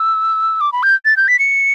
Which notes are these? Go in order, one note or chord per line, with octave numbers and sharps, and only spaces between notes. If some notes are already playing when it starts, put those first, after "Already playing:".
Already playing: E6
D6
B5
G6
A6
G6
B6
C#7